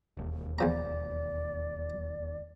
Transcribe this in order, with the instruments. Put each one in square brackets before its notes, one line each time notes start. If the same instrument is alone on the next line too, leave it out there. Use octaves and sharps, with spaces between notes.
[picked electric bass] E1 D#2
[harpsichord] E2 F3 A#5 [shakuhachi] D5